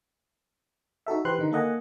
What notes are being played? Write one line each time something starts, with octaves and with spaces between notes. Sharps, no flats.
D#4 F#4 A4 E5
E3 G4 B4 C5 C6 F#6
D3 D#3 D#4
A#3 A4 D#5 F#5 G#5